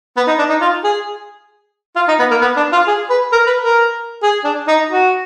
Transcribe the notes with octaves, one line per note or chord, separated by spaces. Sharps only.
B3
D#4
D4
D#4
F4
G#4
F4
D#4
B3
A#3
B3
D4
F4
G#4
B4
A#4
B4
A#4
G#4
D4
D#4
F#4